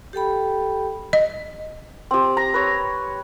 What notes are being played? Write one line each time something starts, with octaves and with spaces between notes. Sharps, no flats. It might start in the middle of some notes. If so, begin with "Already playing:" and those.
G4 A4 G5 B5
D#5
C4 G4
A#5
B4 C#5